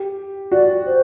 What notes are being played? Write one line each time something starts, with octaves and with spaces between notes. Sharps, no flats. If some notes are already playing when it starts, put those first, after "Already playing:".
Already playing: G4
F#4 D5
C5